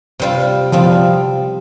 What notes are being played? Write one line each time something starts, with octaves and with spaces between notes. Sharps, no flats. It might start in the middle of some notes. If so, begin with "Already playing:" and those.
C3 G3 C4 F4
C3 F3 G3 C4 F4